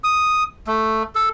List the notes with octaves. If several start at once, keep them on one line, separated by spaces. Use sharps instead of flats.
D#6
A3
A4